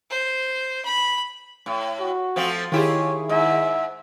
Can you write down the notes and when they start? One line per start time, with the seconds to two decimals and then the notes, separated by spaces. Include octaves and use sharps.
0.10 C5
0.85 B5
1.66 A2
2.00 F#4
2.36 F3 A3 C4
2.72 D#3 E4 F4 G4 G#4 C#5
3.29 G#2 E5